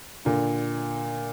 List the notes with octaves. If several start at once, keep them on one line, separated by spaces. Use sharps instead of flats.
A#2 D3